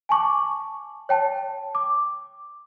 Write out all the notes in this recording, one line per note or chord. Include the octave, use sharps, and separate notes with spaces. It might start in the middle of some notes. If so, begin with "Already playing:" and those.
G#5 A5 C#6 D6
C#5 G5 A5
D6